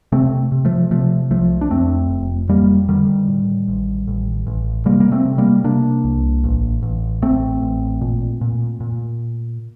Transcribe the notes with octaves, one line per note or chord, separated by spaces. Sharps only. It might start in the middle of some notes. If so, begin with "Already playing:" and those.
C3 A3 C4
C3
F3 A3
C3 F3 A3
C2 F3 A3
D4
F2 A3 C4
F1
F2 G3 A#3
D3 D#3 G3
A2
A1
A1
A1
C3 G3 A#3
A#3
A3 C4
C3
G3 A#3
C3 A#3 D4
C2
A1
A1
A1 A3 C4
A1
A#2
A#2
A#2